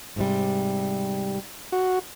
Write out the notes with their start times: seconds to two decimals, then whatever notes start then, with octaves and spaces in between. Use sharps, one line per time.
0.16 G#2 C3 G3
1.72 F#4